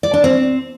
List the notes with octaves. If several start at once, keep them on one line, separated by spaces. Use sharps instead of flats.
D5
D4
C4